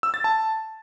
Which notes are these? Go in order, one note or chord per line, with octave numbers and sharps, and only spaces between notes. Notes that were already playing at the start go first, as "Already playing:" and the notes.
E6
A6
A5